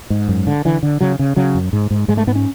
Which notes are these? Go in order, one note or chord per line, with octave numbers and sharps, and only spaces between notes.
G#2
F#2
D3
D3 E3
D3
C#3 F#3
C#3
C#3 F#3
F#2
G#2
G#2
G#2 G#3
A3
G#2 B3
C#4